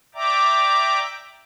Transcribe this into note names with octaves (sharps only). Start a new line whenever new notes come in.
D5 E5 G5 A#5 D6